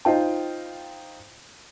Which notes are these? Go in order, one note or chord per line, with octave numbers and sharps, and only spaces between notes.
D#4 F4 C5 D#5 G5